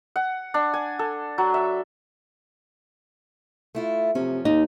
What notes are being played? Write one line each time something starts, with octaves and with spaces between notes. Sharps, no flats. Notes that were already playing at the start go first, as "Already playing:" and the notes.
F#5
D4
G#5
A4
F#3
E5
A3 E4 F4
F#2 C3 F3 C#4
D#2 D#4